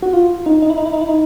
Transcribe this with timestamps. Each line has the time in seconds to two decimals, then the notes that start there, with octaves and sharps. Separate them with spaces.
0.03 F#4
0.13 F4
0.46 D#4
0.62 D#4
0.70 E4
0.78 D#4
0.86 E4
0.93 D#4
1.01 E4
1.09 D#4